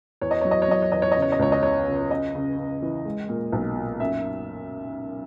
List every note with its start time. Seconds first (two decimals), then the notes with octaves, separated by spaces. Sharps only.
0.21 E2 C#5
0.31 D#5
0.41 F#3 C#5
0.51 D#5
0.62 C#5
0.68 F#3 D#5
0.82 C#5
0.92 E2 D#5
1.02 C#5
1.12 C#3 D#5
1.22 C#5
1.32 D#5
1.39 C#2 C#5
1.52 D#5
1.63 C#3 C#5
1.87 C#3
2.11 C#3 D#5
2.35 C#3
2.58 C#3
2.82 E3
3.05 G#3
3.29 A#2
3.52 B1
3.77 A#2
4.00 F#2 E5